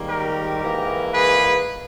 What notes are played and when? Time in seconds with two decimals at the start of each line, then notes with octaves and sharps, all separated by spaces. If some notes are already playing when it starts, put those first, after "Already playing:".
Already playing: G#2 D#3 G3 A#3
0.08 G4 A#4
0.61 G#2 E3 A#3
1.13 G#4 B4